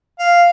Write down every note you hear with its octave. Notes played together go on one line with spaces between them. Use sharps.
F5